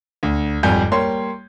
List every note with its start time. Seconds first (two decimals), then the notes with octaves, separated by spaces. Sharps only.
0.23 D2
0.63 G#1 F2 G3 G#5 G6
0.92 G3 A#3 C#5 C6